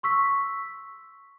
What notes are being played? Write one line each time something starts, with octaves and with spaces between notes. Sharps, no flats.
C6 C#6 E6 B6